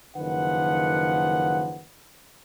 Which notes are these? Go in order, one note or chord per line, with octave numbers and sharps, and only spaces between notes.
F#1 D#3 F3 B4 F#5